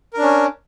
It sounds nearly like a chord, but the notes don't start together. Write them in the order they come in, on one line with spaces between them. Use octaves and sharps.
A#4 D4 C#4